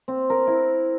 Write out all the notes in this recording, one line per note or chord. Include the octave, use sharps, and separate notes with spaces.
C4
A#4
E4